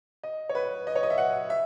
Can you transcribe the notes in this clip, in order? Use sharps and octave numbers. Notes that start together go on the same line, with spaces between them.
D#5
C#5
B4
D#5
C#5
D#5
E5
F#5
E5